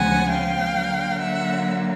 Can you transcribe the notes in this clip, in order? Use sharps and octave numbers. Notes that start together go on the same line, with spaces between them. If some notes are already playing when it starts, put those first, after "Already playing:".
Already playing: D2 C#3 F3 G#3 B3 F#5 G#5
F5 G5
D3 F#3 A#3
E5 F#5